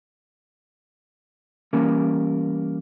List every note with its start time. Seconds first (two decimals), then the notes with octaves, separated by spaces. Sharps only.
1.73 E3 G3 A#3 C#4 A#4